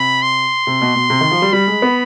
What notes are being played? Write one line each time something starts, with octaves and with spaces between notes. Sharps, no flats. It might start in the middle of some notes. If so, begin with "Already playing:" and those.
Already playing: C3 B5
C6
C3
B2
B2
C3
D#3
F3
G3
G3 B5
G#3
B3